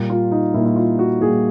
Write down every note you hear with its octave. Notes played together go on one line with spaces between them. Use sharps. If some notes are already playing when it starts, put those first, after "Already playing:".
Already playing: A#2 G3 A#3
F4
D#4
A#2 G3 A#3 E4
E4
F4
F#4
A#2 G3 A#3 G#4